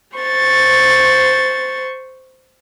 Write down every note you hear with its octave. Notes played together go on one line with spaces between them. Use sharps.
C5 C#6 A6